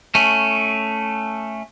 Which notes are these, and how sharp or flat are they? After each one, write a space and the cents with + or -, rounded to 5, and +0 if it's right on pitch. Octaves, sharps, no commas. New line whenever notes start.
A3 +0 C#4 +0